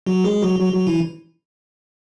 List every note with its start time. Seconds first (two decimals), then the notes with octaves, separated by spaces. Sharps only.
0.06 F#3 F#4
0.24 G#3 G#4
0.42 F#3 F#4
0.60 F#3 F#4
0.74 F#3 F#4
0.87 E3 E4